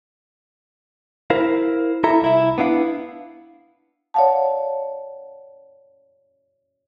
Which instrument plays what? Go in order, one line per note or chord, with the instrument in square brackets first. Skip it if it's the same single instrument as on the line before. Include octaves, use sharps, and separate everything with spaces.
[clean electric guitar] E4 A#4 C5 F5
E4 A4 E5 A#5
C2 E4 E5
B3 D4 E4 F5
[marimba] C#5 D5 F5 F#5 A5